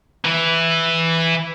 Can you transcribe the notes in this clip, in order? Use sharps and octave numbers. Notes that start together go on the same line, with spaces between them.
E3 E4